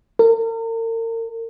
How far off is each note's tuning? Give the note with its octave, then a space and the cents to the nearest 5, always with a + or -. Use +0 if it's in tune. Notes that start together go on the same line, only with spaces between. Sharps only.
A#4 -40